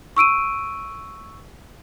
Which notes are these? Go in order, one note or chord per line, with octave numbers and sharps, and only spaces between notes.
C#6 E6 D7 D#7